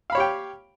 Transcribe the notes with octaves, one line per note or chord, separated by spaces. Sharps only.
G4 C#5 F5 G5 B5